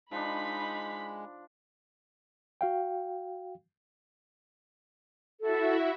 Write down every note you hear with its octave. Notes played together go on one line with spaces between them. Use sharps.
F3 G#3 D4 D#4 B5 B6
F#4 F5 G5
E4 F#4 A4 E5